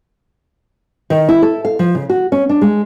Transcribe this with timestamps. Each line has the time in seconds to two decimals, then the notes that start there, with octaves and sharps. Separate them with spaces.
1.10 D#3
1.29 E4
1.42 A4
1.65 F5
1.79 F3
1.95 C#3
2.10 F#4
2.32 C#4
2.49 D4
2.61 G#3